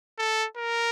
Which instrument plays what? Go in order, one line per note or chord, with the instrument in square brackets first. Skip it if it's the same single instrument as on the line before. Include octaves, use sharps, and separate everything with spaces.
[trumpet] A4
A#4